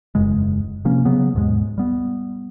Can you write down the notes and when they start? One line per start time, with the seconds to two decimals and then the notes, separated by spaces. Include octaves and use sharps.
0.15 E1 F#2 C#3 G#3
0.85 C3 F3 A#3 C#4
1.05 C#3 F#3 B3
1.35 D#2 G#2 B2 G#3
1.78 G3 B3